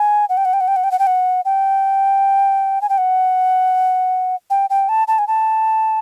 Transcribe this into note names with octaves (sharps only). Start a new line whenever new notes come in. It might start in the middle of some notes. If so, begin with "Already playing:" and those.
Already playing: G#5
F#5
G5
F#5
G5
F#5
G5
F#5
G5
F#5
G5
F#5
G5
G#5
G5
F#5
G5
G5
A5
A5
G#5
A5